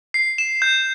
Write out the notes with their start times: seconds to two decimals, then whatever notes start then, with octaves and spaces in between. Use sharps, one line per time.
0.14 C7
0.38 E7
0.62 G6